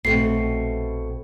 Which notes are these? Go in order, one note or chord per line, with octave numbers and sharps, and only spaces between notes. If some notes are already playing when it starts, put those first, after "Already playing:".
A#1 B2 A3 C4 C7